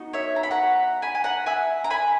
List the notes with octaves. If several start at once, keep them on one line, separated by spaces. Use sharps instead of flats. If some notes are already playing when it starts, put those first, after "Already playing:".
Already playing: B3 D#4 F#4
C#5 E5
A#5
B5
F#5 A#5
G#5 B5
G#5
F#5 A#5
E5 G#5
A#5
G#5 B5